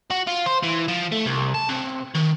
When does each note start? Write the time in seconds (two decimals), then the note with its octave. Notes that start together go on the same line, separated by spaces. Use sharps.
0.11 F#4
0.27 F4
0.46 C5
0.63 E3
0.88 F3
1.12 A3
1.26 C2
1.54 A5
1.69 C3
2.14 D#3